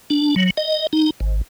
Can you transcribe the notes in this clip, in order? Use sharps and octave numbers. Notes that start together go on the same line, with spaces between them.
D4
F#3
D#5
D#4
G#1